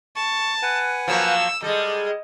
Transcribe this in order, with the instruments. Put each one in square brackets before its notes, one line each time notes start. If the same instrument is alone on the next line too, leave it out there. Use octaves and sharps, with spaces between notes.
[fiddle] A5 [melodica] C#6
[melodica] B4 F#5 G#5
[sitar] F3 F#3 A#3 [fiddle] E6
[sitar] G3 G#3 [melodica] A4 [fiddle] D#5